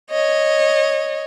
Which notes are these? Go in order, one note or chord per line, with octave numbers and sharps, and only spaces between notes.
C#5 D#5